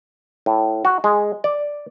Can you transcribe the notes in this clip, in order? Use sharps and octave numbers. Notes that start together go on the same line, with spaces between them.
A2
F#4
G#3
D5